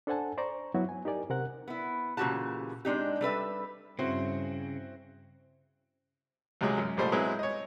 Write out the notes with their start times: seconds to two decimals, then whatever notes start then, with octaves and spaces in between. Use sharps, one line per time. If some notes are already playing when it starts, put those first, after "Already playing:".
0.07 D4 A4 C5 F#5 G#5 A5
0.37 C5 D5 A#5 C#6
0.74 F#3 B3 E4 F#4
0.89 G#5
1.05 D#4 G4 A#4 D5 G#5
1.30 C3 C4 A#4 F#5 F#6
1.68 B3 E4
2.17 A#2 C#3 E3 F#4 G4 A5
2.85 G#3 C4 D4 D#4 G4
3.21 G3 A4 B4 E5
3.99 G2 C#3 C4 E4 F#4 C5
6.61 C#2 C3 F#3 G#3
6.78 F#2
6.97 C2 A#2 G3 A3 C5 D#5
7.12 F#3 G#3 B3 C4 E4
7.39 C#5 D#5